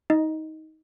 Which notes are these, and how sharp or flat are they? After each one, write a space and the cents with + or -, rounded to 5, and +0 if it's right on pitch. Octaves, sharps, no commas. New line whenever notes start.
D#4 +20 D#5 -5